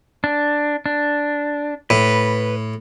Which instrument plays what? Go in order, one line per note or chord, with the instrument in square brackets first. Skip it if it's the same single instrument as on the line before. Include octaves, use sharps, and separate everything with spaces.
[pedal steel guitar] D4
D4
[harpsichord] A2 [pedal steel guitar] B4